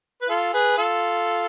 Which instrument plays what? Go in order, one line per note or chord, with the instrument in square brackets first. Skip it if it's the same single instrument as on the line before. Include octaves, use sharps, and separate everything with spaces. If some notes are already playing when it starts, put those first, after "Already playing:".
[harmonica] B4
F4 A4
G#4 B4
F4 A4